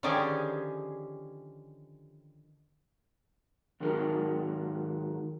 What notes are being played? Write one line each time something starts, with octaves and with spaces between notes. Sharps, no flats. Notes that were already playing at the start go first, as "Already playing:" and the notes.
D3 D#3 F3 C#4 G4 G#4
G#2 D#3 F#3 D#4 A#4